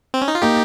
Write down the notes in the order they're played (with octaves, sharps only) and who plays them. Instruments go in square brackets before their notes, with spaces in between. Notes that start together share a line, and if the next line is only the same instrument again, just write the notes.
[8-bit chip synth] C4
C#4
D#4
F4
[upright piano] A#3 [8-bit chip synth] D#4 G4